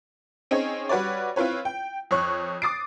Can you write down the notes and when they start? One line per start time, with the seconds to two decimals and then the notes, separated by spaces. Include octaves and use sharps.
0.51 C4 C#4 D#4 G#4 C#5
0.89 G3 F#4 B4 C#5 D5
1.36 C4 E4 F4 B4 C#5
1.65 G5
2.11 F2 C#5 C#6 F#6
2.62 D6 D#6 A6 C7 D7